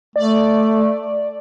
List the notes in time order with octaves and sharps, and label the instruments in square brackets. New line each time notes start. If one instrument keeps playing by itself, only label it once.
[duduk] A3 [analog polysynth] D5